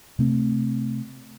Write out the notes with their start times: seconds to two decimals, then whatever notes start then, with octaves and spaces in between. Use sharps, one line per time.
0.19 C3 A3 C4